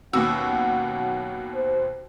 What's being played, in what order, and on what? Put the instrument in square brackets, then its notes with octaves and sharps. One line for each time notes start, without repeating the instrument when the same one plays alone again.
[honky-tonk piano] D#2 B2 E6 [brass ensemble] F#3 C#4 F#5 [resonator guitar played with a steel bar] F#4
[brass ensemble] C5